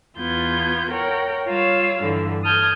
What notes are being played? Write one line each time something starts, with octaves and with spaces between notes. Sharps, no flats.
E2 B3 F4 G6 G#6
A#4 C#5 F#5 G5
G3 F4 C#5 F5 E6
G2 D3 E3
A5 D#6 F6 G6 G#6